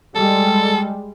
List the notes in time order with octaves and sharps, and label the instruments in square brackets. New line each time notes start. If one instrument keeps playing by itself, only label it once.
[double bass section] G3 G#3 [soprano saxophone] A4